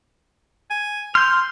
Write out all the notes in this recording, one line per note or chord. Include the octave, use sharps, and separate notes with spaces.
G#5
C6 F6 G6